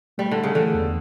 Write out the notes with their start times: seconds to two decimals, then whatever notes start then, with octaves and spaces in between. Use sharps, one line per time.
0.18 G3 A3
0.31 D3 A3
0.43 C#3
0.55 D3 E3
0.74 E2